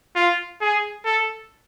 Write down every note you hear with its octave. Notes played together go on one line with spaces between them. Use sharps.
F4
G#4
A4